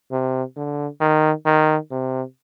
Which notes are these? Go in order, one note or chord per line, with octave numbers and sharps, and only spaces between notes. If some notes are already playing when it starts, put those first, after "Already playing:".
C3
D3
D#3
D#3
C3